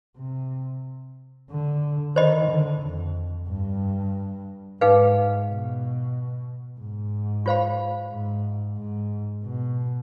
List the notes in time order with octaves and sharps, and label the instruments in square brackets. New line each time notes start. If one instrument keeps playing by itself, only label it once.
[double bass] C3
D3
[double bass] D#3 [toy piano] C5 D#5 B5
[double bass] D3
F2
G2
[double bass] G#2 [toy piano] D#4 G#4 B4 F5
[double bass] B2
G#2
[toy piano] F4 C5 F5 B5
[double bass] G#2
G#2
B2